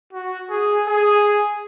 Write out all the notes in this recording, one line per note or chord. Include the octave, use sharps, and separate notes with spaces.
F#4
G#4
G#4